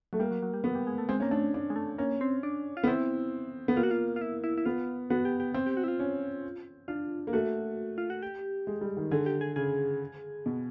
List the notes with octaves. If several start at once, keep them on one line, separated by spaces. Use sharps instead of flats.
F#3 A3
G3 A#3
F#3
F#3
G3
F#3 B3
G3
G#3
A3
G#3 C4
A#3 C#4
A3 D4
D4
G#3
A3
A#3 C#4
C4
D4
F4
B3
C4 E4
B3
A#3 F4
F#4
F4
F4
E4
E4
E4
B3 F4
B3 F#4
G4
G4
C4
G4
F#4
E4
F4
C#4
D4 F4
A#3
A3 F#4
F4
F#4
G4
G#3
G3
D#3
D3 G#4
G4
G#4
C#3 G#4
B2